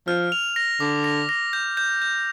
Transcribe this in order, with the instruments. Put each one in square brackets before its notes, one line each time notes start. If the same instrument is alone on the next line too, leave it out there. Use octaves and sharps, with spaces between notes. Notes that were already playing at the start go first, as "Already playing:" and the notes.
[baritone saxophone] F3 [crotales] F6
[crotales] F7
A#6
[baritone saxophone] D3 [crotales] D6
[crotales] A#6
A#6
G6
G6
G6